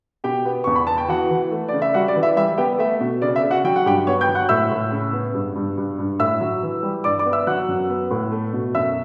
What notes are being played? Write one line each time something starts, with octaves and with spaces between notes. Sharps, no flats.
B2 G4 G5
B3
E2 C#6
B5
B3 A5
G5
E3 F#4 F#5
E3
A3
C#3 D5
E5
G3 F#4 F#5
D5
E3
E5
G3 E5
B3 G4 G5
A3 E5
B2
C#3 D5
E5
C#3
F#4 F#5
F#3 G5
F#5
G2 G4 G5
B3 C#5 C#6
G5 G6
F#3
F#5 F#6
A2 E5 E6
A2
C#3
B3
G2
G2
G2
G2
A2 E5 E6
F#3
E3
G3
G2 D5 D6
D5 D6
B3
E5 E6
F#3 F#5 F#6
F#2
B3
A2
A3
B2
F#2 E5 E6